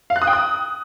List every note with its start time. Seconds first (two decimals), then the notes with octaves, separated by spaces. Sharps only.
0.10 F5
0.16 F#6
0.22 D#6
0.27 G5
0.33 D#6